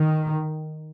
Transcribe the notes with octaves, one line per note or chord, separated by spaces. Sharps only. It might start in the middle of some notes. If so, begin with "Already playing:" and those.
Already playing: D#3